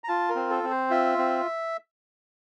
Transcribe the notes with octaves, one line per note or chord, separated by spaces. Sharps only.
A#5
F4 A5
A#4
C4
A4
C4
C5
F4 E5
C4